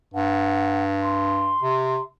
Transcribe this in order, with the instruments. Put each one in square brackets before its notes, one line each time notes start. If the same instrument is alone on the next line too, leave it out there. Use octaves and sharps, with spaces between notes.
[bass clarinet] G2 [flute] F#5
[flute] C6
[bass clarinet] C3